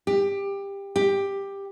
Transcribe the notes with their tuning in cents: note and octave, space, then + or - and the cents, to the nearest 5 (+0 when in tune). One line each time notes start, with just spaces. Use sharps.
G4 +20
G4 +10